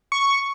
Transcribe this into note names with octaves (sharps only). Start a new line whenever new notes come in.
C#6